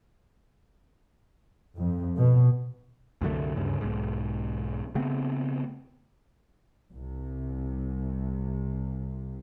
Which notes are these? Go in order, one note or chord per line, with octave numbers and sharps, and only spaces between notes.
F2
B2
C2 F#2 D3 A3
D2 G2 C#3
B1 G#2
C#3 A3 B3 C4
C2 C3